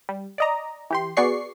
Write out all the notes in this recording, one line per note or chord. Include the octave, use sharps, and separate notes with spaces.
G3
D5 D#5 A#5
E3 G4 C6
B3 F#4 G#4 D5 C#6 C7